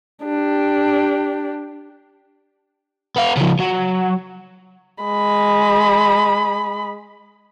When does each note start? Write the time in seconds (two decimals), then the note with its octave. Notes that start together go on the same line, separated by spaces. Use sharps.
0.24 D4 G4
3.16 B3 F5
3.37 C#3 F3
3.60 F#3
5.04 G#3 B5